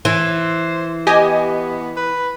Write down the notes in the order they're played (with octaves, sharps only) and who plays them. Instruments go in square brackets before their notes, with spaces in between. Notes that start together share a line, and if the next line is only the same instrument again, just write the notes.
[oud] E3 [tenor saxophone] C5
[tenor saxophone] B3 [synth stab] G4 D#5 G#5
[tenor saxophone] B4